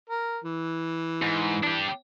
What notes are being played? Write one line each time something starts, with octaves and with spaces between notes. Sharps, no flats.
A#4
E3
G#2
D4 G4